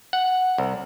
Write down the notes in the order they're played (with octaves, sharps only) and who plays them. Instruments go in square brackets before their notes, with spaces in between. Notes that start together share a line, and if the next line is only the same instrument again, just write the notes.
[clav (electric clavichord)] F#5
C2